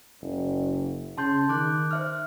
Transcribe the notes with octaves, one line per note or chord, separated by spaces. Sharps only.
F#1
C#3 A5 C6 G6
D#3 D6 F#6
C5 E5 F6